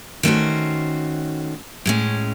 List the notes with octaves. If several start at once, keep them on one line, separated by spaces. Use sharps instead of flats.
D#3 A3 C#4 F#4 C5
A2 G#3 C#4